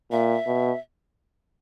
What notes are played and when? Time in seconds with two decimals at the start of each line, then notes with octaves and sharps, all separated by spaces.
0.11 A#2 E5
0.47 B2